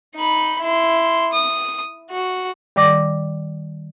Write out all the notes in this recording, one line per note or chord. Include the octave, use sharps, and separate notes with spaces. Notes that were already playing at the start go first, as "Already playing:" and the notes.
D#4 B5
E4 C6
D#6
F#4
D#3 G3 D5 D6 A#6